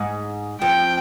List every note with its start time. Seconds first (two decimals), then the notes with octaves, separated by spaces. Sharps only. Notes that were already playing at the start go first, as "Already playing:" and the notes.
Already playing: G#2
0.61 F2 G5